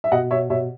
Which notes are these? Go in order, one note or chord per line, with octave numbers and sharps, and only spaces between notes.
E5
B2 D#5 F#5
B2 C#5 E5
B2 C#5 E5